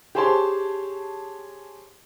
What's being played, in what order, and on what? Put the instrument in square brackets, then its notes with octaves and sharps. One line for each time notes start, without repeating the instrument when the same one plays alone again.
[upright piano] G4 G#4 C5 C#5 A5 C6